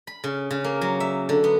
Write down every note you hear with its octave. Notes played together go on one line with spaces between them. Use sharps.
B5
C#3
C#3
A#3
F#3
E5
D3
B3